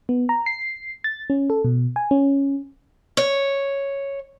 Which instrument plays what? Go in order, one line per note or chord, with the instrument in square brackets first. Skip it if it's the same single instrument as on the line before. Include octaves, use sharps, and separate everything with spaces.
[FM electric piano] B3
A#5
C7
A6
C#4
A4
B2
G#5
C#4
[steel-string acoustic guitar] C#5